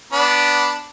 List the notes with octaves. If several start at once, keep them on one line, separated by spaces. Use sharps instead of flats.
B3 D4 B5